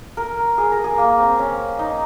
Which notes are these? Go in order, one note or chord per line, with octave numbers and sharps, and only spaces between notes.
A#4
G#4
A#4
G#4
A#3
C4
C#4
D#4